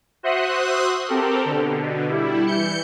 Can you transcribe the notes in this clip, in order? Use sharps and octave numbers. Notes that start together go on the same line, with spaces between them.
F#4 C5 E5 C6 D#6 F#6
C4 G4 A4 A#4
B2 D3
G3 E4
E3 G6 C#7